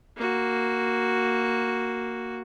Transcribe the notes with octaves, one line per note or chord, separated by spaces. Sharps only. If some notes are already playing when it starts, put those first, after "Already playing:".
A#3 F#4